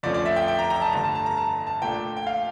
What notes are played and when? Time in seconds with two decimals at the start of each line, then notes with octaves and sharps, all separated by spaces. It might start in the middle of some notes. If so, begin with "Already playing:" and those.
0.03 F2 D3 F3 A3 C#4 D5
0.14 D5
0.25 E5
0.36 G5
0.48 G5
0.59 A#5
0.70 A#5
0.82 A5
0.93 G2 D3 A3 A#5
1.04 A5
1.15 A5
1.26 A#5
1.37 A5
1.67 A5
1.82 A#2 A3 D4 G5
2.17 G5
2.27 F5